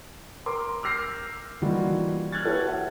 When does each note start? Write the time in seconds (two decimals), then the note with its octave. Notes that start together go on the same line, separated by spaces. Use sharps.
0.46 A#4 C6 D6
0.83 D6 E6 F6 G6 A#6 C7
1.62 E3 G3 A#3 D#4 F4 F#4
2.32 F6 F#6 G#6 A6
2.45 E4 F#4 G4 A4 B4 C#5
2.65 E5 F#5